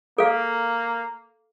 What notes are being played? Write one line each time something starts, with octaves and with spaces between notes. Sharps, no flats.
A#3 A4 F5